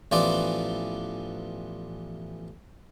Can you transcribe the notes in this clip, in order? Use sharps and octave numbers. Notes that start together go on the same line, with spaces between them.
A1 E3 F3 B3 C4 D5